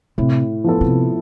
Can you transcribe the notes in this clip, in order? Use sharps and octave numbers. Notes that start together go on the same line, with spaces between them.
A2 C3
F3 B3 F4 A4
C3